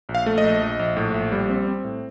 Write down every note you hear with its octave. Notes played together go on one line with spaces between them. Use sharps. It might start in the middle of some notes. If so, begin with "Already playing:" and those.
A#1
F5
A3
D#5
A#1
A#1
A#1
A2
A#1
G3
C4
C4
A2